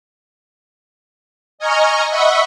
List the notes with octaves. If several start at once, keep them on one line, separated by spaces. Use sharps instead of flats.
D#5 G#5 A#5 C#6 F6
D#5 E5 F#5 B5 C#6 E6